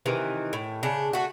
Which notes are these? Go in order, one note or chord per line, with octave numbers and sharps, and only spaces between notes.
C3 D#3 E3
A2
C#3 D4
A3 F#4